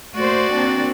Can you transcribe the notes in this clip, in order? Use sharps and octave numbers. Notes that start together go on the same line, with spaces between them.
A3 A#3 F#4 C5 D5
A#3 C4 D4